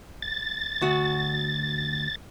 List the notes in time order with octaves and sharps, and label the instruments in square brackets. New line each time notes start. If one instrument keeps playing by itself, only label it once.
[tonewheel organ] A6
[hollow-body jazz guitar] D2 F#4